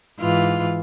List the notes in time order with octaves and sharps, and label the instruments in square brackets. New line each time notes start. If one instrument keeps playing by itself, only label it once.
[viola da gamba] G#2 E3 F4